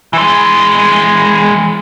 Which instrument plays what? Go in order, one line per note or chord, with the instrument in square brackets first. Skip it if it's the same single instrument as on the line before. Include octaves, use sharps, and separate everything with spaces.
[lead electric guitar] E3 G#3